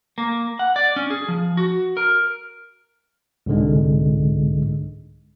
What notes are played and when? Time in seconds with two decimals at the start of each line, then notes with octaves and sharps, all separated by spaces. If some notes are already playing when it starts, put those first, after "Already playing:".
0.18 A#3
0.59 F#5
0.76 D5
0.96 C#4
1.10 G#4
1.28 F3
1.57 F#4
1.97 A#4
3.46 C2 G#2 D3 G#3